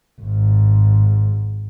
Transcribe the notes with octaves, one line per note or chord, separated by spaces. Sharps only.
G#1 G#2